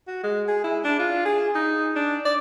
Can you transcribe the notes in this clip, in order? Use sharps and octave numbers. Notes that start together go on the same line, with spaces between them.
F#4
G#3
G#4
E4
D4
F4
G#4
D#4
D4
D5